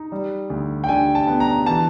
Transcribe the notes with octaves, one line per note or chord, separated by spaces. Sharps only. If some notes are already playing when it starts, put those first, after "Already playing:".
Already playing: D#4
G3
D2
G5
D3 G#5
A5
B3
A#5
E3 A5